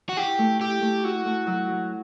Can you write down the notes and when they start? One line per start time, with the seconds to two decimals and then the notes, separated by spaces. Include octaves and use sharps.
0.09 F#4
0.17 E4 G4
0.39 A3
0.61 E4 G4
0.82 A3
1.04 E4 F#4
1.26 A3
1.47 F#3
1.70 F#3